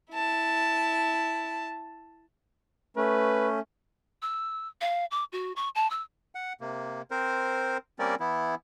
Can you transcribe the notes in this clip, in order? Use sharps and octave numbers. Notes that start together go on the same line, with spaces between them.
E4 A5
A3 C#4 B4
E6
F5
D6
F#4
C#6
A5
E6
F#5
C3 A#3
C4 A#4 C5
G3 A#3 C4 C#4 A#4 D5
E3 B3 E4